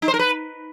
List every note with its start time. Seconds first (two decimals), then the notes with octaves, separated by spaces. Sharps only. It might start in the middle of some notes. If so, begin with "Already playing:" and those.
0.02 D#4
0.08 C5
0.14 A#4
0.19 B4